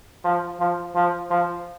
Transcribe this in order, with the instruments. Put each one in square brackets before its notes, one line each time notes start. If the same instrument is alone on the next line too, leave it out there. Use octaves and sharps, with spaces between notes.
[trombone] F3
F3
F3
F3